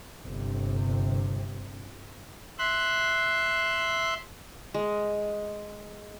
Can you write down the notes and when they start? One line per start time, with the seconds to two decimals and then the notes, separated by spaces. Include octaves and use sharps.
0.22 G1 C3
2.59 E5 C6 F#6
4.74 G#3